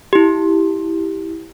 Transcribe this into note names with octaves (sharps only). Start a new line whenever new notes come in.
E4 G4